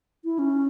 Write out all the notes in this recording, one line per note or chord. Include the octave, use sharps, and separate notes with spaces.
E4
C#4